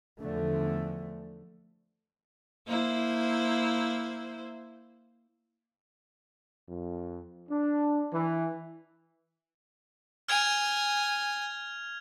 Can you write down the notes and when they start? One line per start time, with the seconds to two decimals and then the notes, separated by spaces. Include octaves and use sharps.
0.19 E2 D3 F3 A3
2.68 A#3 E4 C5
6.69 F2
7.49 D4
8.13 E3
10.28 G#5 F6 G#6 F7